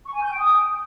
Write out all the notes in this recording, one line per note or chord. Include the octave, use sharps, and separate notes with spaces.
C#6
G#5
G6
G5
D#6